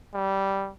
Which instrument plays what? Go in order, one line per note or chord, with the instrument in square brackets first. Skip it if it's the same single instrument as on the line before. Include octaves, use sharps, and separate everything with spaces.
[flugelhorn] G3